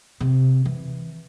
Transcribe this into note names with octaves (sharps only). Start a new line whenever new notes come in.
C3
E3